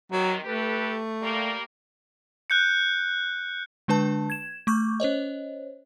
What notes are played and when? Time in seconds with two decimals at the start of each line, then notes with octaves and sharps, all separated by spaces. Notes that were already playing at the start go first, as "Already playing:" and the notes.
0.12 C3 D#3 F#3
0.45 A3 G4 A4 B4
1.22 G3 A#3
2.50 F#6 G6 C#7
3.88 D3 G#3 D4 B4 A5
4.30 G#6 E7
4.67 A3 C#6 D6 G6
5.00 C#4 C5 C#5 D#5